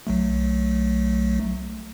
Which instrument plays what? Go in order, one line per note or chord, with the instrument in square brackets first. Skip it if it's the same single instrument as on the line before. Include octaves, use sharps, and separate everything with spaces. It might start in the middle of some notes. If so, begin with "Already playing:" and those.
[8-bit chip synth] B1 F#3 A3